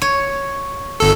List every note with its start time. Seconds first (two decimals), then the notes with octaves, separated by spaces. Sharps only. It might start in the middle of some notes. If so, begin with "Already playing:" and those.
0.02 C#5
1.00 G1 A4